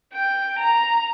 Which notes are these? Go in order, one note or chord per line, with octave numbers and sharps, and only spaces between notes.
G5
A#5